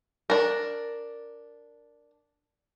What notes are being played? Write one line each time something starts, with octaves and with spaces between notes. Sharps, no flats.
D4 A#4